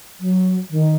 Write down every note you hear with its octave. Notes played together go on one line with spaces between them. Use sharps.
F#3
D#3